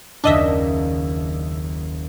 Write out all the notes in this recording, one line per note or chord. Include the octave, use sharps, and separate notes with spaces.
F#1 D#2 D4 D#5 E5